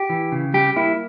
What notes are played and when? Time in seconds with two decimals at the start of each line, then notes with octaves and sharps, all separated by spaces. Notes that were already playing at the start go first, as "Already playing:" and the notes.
Already playing: G4
0.10 E3
0.32 C#3
0.54 G3 G4
0.76 A#3 E4